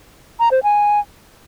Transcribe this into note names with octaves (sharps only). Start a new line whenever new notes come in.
A#5
C5
G#5